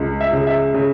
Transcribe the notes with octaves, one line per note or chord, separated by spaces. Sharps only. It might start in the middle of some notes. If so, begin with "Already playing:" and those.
Already playing: C#2
E5
C#3
E5
C#3